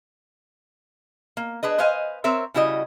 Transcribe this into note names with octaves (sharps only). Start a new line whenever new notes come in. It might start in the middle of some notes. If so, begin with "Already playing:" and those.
A#3
D4 G#4 B4 D#5
B4 C5 D#5 F5 G#5
C4 A#4 C#5 E5
C#3 G3 E4 F#4 G#4 D#5